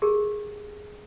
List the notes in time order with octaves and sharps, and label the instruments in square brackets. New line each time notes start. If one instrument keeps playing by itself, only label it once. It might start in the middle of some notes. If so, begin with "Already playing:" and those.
[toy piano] G4 G#4 A#4